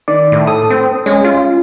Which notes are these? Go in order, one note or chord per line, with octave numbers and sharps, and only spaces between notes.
D#3 D5
A2
A4 D#6
C4
G#3 C#4
F4